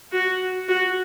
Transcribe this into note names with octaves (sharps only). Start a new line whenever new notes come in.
F#4
F#4